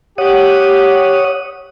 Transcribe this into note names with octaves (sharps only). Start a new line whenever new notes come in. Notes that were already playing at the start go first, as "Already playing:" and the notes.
G4 C#5 F#5 D#6